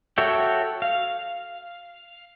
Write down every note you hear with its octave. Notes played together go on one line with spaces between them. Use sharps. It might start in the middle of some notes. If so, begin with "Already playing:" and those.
F#4 A4 C#5 E5 G5
F5